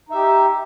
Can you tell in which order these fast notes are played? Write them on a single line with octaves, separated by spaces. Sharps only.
D#4 E5 G4